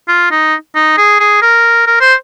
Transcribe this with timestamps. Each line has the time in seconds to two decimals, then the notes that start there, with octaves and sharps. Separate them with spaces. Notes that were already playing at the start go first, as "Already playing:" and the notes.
0.08 F4
0.31 D#4
0.75 D#4
0.98 G#4
1.20 G#4
1.42 A#4
1.87 A#4
2.01 C5